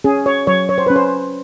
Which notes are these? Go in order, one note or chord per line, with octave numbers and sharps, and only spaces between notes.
C#4 G#4
C#5
F#3 C#5
C#5
C5
C#4 B4
C5